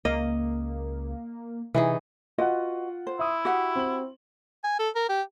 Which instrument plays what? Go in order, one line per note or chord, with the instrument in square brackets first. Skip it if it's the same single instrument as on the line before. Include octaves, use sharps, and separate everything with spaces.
[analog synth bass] C#2 [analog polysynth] A#3 [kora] D#5
[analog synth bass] C3 [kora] E3 D#4 G#4
[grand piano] F4 F#5 [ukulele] F#4 B4 D#5
[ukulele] C5
[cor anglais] E4 [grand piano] E5 D#6
[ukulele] F#4 G4 F#5
[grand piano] C4 F#7
[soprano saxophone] G#5
A4
A#4
G4